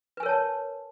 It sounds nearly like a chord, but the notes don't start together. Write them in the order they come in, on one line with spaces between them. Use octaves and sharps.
B4 G#5 A#4 C#5 A5